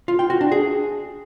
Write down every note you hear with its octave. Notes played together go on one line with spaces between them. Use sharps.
F4
G5
F#4
D4
G#4